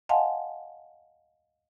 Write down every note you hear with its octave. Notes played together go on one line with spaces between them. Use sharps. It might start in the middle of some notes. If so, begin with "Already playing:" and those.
D#5 F5 F#5 G#5 A5 C6